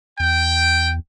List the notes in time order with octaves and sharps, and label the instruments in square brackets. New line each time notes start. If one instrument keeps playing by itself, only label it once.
[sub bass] E2 [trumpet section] G5